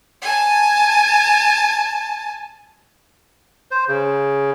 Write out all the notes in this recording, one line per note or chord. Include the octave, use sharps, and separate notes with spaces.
G#5 A5
C5
C#3